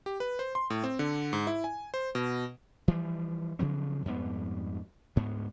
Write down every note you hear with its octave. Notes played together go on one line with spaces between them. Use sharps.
G4
B4
C5
C6
A2
C4
D3
G#2
E4
G#5
C5
B2
E3 F3 G3
C#3 F3 F#3 C4
F2 G#2 G3 B3
D2 G#2 B3